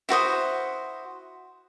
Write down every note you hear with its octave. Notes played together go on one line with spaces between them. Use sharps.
E4 F#4 C5 D#6